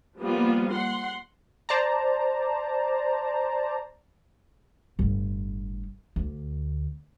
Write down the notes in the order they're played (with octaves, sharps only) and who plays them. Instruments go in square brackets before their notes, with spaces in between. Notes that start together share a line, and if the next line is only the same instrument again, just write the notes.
[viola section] F3 G3 A#3 B3 F4
F#5 C6
[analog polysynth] C5 D5 A5 A#5
[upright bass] G1 A2
D2